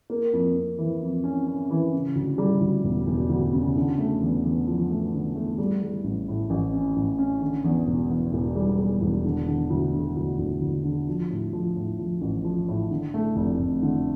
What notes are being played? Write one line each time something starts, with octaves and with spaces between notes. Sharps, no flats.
A#3
F2
F2
E3
F2
C#4
C#4
E3
C#3
D2
G3
D2
E1
E1
D2
C#3
D3
A3
E2
E2
F3
A3
D3
A3
G3
G3
A1
A2
A1
C#4
A1
C#4
D3
E2
E1
E2
E1
G3
G3
E1
D3
D3
D2
D3
D2
D2
D2
D3
F3
A2
F3
A2
F3
A1
F3
A2
D3
A3
F1
F1
D3